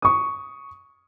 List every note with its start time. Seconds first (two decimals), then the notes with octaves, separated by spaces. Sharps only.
0.02 C#6 D#6